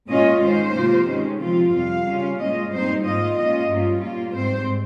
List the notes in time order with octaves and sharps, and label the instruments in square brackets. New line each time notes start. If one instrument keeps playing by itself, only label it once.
[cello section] A#2 G#3 C#4 F4 D#5
D#3 G#3 C#4 C5
C3 F3 A#3 F4
D#3 G#3 C#4
C3 F3 C4 F4
F2 C3 G3 F5
C#3 G3 C#4 F4
A#2 G#3 C#4 F4 D#5
A#2 G3 C4 D#4 C5
G#2 D#3 A#3 F4 D#5
A#2 G#3 C#4 F4 D#5
G2 G3 A#3 C#4 F4
A#2 G3 A#3 F4
G#2 G3 C4 C5